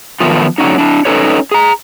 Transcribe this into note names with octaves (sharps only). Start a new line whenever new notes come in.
D#3 F3 F#3 A3 B3 F4
D3 F#3 C#4 D#4
D4 E4
C#4 D#4 A4 B4 C#5
G#4 A#5